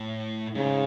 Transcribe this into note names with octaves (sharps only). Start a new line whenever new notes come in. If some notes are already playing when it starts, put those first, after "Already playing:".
Already playing: A2
G#2 C#3